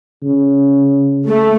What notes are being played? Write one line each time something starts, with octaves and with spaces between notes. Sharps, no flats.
C#3
A3